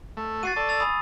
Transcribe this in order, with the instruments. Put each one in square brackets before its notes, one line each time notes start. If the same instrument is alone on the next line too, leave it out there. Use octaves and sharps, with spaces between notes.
[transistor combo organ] A3
[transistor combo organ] F#4 [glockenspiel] A6 C7 D#7
[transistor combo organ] A4 D5 [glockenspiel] C#6
[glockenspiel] E6 A6 F7
G#5 B5 D#6